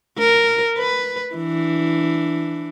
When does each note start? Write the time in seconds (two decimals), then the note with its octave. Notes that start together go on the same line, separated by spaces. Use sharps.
0.18 A#4
0.78 B4
1.34 E3 D4